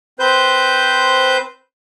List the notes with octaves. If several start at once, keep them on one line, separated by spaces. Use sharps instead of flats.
C4 B4 C5 G6